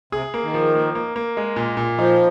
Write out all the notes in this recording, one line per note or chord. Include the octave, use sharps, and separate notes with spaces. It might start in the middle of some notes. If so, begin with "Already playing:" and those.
C3 G#4
A#3
D#3
F3
A#3
A#3
A#3
G#3
A#2
A#2
F3 D#4